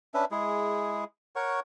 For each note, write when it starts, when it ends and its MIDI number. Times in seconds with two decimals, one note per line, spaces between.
0.14 0.25 61
0.14 0.25 62
0.14 0.25 71
0.14 0.25 76
0.31 1.04 56
0.31 1.04 64
0.31 1.04 68
1.36 1.60 70
1.36 1.60 73
1.36 1.60 78
1.36 1.60 85